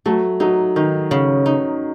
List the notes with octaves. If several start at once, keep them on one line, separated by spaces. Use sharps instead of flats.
F#3 A3
F#3 D#4
D#3 D#4
C#3
D#4